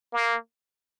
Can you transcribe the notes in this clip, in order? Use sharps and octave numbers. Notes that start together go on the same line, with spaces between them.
A#3